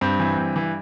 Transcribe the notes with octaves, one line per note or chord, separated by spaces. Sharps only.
G2 C4
E3
G2
E3